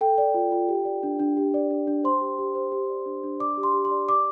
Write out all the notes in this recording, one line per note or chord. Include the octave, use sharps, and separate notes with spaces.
A4 G5
D5
F4
F4
G4
D5
D4
D4
G4
D5
D4
D4
C5 C6
G4
G4
C5
G4
D5
D4
D4
D5 D6
G4
C6
G4
C6
D5
D5 D6